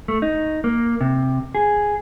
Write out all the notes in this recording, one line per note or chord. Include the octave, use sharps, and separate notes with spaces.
A3
D#4
A#3
C3
G#4